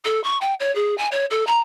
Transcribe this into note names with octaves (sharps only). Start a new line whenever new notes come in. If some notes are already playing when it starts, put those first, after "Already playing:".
A4
C#6
G5
C#5
G#4
G#5
C#5
A4
A#5